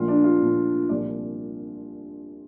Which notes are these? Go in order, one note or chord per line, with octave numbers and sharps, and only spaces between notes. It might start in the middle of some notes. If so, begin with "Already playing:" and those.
Already playing: A#1 A#2 F3 F4
D4
F4
A#1 A#2 F3
C2 A#2 F3 D5